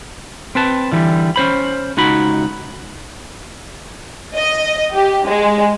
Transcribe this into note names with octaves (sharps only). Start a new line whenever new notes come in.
C4 B4 A5
D3 E3 G3
C#4 C5 B5
C#2 D#4 F#4 B5
D#5
G4
G#3